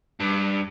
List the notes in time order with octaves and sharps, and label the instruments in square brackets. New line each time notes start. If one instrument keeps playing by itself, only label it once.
[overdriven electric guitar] G2